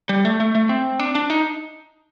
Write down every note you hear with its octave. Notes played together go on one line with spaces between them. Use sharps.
G3
A3
A3
A3
C4
D4
D4
D#4